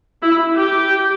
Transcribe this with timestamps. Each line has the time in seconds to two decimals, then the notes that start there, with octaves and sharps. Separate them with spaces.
0.22 E4
0.56 G4